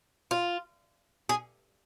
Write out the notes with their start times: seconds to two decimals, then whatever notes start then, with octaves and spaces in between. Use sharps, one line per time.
0.31 F4
1.29 G#4